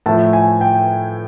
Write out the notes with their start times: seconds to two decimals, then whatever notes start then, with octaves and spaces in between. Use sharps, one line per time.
0.06 A2 F3 A3 A5
0.33 G#5
0.61 G5